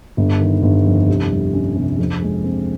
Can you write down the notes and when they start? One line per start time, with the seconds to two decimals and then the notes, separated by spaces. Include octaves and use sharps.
0.17 G1
0.40 D#3
0.63 G1
0.86 F2
1.09 C2
1.31 G3
1.53 C#4
1.76 C3
1.99 F2
2.21 G#3
2.44 C4